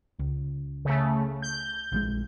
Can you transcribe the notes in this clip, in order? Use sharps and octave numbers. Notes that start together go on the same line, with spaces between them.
C#2
C#3 A3
G6
A#1 D#3 G#3